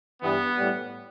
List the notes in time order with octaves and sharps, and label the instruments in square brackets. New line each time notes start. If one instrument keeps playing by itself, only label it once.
[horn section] G2 E3 G3 B3
A2 G3